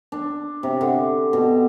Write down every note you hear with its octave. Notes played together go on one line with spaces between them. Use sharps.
D4
C3
D3
B2